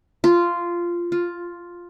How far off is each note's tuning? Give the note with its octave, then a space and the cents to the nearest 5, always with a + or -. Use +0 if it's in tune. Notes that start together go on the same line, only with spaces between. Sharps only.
F4 -10
F4 +5